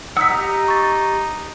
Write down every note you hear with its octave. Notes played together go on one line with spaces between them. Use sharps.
D#4 F#5 D#6 E6 B6
G4 A#5
C#6 A6